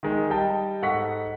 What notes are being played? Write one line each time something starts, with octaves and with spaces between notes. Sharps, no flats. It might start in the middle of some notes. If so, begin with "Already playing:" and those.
D#3 G#3
G3 D#5 G5 A5
G#2 A4 F#5 C#6 B6